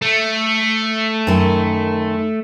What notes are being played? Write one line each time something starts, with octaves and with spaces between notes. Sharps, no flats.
A3
F#2 D#3